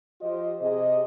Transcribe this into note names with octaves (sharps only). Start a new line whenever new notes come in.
F3 F4 G4 C5 D#5
C3 G#4 D#5